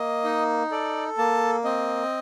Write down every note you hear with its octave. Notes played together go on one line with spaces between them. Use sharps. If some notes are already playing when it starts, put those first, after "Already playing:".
Already playing: A#3 D#5
D#4
A4 D5
A#3 A5
C4 D#5